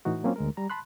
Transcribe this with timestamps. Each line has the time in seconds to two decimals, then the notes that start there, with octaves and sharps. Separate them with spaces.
0.05 A2 E3 D#4 F#4
0.23 F#3 A#3 C4 C#4 F4
0.36 D2 G#3 A#4
0.57 G3 A#5
0.70 A5 B5 C6 F#6